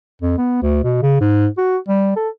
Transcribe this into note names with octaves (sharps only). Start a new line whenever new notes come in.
F2
B3
D2
B2
C#3
G#2
F#4
G3
A4